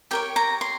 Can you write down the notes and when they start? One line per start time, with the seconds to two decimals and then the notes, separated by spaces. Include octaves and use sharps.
0.11 G4 A#4 C#5 G5
0.36 A#5
0.61 C6